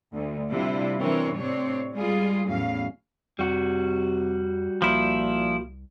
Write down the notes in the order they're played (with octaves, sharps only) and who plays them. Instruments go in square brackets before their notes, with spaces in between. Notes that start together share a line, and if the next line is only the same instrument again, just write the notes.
[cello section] D2
C3 G3 D4 E4 F4
E3 C4 D4 A#4 C#5
A2 C3 C4 D4 C#5
G3 G#3 F4 G#4
E2 A2 F#3 C#4 F5
[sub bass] F2 [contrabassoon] C3 [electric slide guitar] G3 F#4
[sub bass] C2 [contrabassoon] A#2 [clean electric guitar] F3 E4